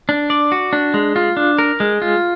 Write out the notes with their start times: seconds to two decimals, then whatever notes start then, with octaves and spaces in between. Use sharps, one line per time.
0.09 D4
0.30 D5
0.52 F#4
0.73 D4
0.94 G#3
1.16 F4
1.37 D4
1.59 A#4
1.80 G#3
2.02 F4